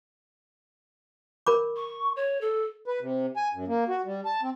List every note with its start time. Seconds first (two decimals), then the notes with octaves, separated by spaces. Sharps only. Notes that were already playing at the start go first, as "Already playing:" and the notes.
1.47 A#4 B5 D6
1.76 C#6
2.16 C#5
2.41 A4
2.86 B4
3.01 C3
3.37 G#5
3.53 F#2
3.68 A#3
3.88 F#4
4.05 G3
4.25 A5
4.42 C4